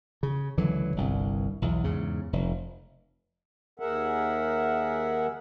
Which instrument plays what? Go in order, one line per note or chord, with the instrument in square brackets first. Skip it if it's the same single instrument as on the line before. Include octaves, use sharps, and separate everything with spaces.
[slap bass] C#3
C#2 D3 E3 F#3
G1 C2 G2
B1 E2
E2 G#2 C#3
F1
[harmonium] D#2 G#4 A#4 E5 F#5